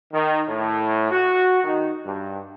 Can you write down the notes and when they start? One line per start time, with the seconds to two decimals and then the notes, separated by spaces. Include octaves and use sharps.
0.13 D#3
0.49 A2
1.11 F#4
1.64 D#3
2.05 G2